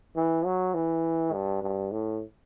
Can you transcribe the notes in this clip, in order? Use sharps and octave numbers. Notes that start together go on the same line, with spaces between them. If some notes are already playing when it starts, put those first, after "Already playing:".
E3
F#3
E3
G2
G2
A2